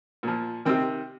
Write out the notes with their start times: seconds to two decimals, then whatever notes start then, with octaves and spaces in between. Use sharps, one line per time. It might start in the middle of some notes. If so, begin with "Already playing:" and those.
0.23 A#2 F3
0.65 C3 D#3 C4